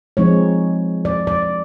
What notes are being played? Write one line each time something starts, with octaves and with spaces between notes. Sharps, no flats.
F3 G#3 C4 D#4 C#5
D5
D5